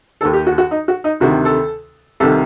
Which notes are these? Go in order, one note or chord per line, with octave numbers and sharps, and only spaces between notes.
D#2 D#3 A4
G4
F#4
F#4
D#4
F#4
D#4
D2 C3 D#3 F#4
A4
C2 C3 D#3 A4